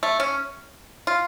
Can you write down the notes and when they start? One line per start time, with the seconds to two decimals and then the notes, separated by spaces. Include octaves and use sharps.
0.03 A3
0.20 C#4
1.07 F4